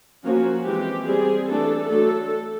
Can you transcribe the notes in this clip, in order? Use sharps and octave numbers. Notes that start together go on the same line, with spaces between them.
F3 A#3 C#4 F#4
E3 G#3 C4 G4
G3 C4 G#4
E3 A3 D4 A4
F#3 A3 D4 A4